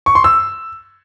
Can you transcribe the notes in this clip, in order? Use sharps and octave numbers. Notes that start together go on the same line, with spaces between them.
C#6
C6
E6